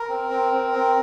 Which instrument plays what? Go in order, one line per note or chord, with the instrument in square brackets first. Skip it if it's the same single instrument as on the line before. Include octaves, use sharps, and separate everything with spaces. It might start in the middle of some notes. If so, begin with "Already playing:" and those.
Already playing: [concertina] A#4
C4
C4
C4
C4